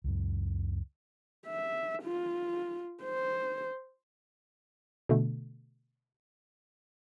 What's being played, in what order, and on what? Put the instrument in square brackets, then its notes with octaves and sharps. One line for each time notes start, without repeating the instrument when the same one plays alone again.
[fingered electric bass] C#2 F#2
[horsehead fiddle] E5
F4
C5
[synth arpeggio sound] B2 D3 A3